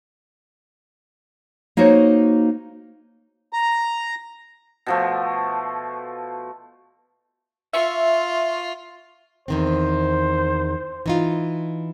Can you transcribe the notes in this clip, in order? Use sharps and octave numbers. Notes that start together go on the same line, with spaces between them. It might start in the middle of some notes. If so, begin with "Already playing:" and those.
A#3 D#4 F#4 C5 C#5
A#5
B2 F3 A3
F4 E5 C#6
E2 D#3 C4 C5
E3 D#4 F4